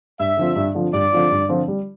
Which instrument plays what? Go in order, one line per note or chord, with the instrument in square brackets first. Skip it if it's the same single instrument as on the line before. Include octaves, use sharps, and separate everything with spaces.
[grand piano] G2 [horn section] E5
[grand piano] D3 F3 C4 F4
G2
D3 F3 C4 F4
[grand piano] G2 [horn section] D5
[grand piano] D3 F3 C4 F4
G2
D3 F3 C4 F4
G3